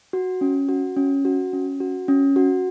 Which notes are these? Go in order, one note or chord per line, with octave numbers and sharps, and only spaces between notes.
F#4
C#4
F#4
C#4
F#4
C#4
F#4
C#4
F#4